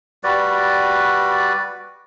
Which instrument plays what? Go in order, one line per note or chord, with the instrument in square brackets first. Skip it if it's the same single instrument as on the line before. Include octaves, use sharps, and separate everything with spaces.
[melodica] G3 F#4 B4 D5